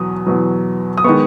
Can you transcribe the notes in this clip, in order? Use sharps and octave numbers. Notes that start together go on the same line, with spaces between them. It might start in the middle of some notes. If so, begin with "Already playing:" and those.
Already playing: E2 B2 F#3 D#6
E2 B2 F#3
D#6
D#3 G#3 B3 C#6